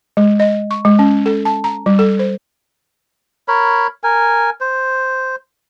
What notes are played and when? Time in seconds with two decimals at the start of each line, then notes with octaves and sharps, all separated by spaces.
0.17 G#3
0.40 D#5
0.71 C#6
0.85 G#3
0.99 C#4
1.26 A4
1.45 A5
1.64 A#5
1.86 G3
1.99 A4
2.19 C5
3.48 A#4 C#5 B5
4.04 A#4 G#5
4.61 C5